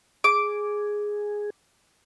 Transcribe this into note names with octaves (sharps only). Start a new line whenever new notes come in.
G#4 D6